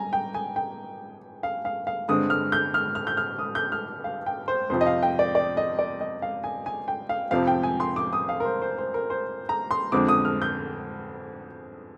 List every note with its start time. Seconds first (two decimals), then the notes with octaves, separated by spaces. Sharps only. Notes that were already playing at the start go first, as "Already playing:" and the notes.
Already playing: G3 G#5 A#5
0.13 G5
0.34 G#5
0.56 G5
1.43 F5
1.65 F5
1.87 F5
2.08 G2 D3 G#3 C4 D#6
2.30 F6
2.52 G6
2.74 F6
2.95 F6
3.07 G6
3.17 F6
3.39 D#6
3.55 G6
3.72 F6
4.04 F5
4.26 G5
4.48 C5
4.70 F2 C3 F3 C5
4.81 D#5
4.86 F5
5.03 G5
5.19 D5
5.35 D5
5.57 D#5
5.79 D5
6.01 D#5
6.22 F5
6.44 G#5
6.66 G#5
6.88 G5
7.09 F5
7.31 F2 C3 F3 C4 F5
7.47 G5
7.63 G#5
7.80 C6
7.96 D6
8.13 D#6
8.29 F5
8.40 A#4
8.45 C5
8.62 C5
8.78 C5
8.94 A#4
9.10 C5
9.49 A#5
9.71 C6
9.92 F2 D3 G#3 C4 D6
10.08 D#6
10.25 F6
10.42 G6